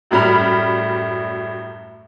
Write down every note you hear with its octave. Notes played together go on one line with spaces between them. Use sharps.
F#2 A2 G3 B5 F6